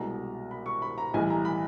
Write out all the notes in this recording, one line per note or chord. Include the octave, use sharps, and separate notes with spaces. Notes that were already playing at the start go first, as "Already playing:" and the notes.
Already playing: C2 B2 G#3 A#5
B5
C#6
B5
A#5
B1 A2 E3 G3 G#5
A#5
B5